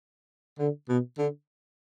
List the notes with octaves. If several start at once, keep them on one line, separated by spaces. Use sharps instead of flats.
D3
B2
D3